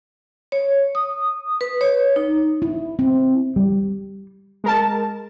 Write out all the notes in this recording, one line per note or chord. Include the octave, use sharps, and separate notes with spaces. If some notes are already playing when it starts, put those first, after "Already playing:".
C#5
D#6
B4
C#5
D#4
E4
C4
G3
G#3 A#4 A5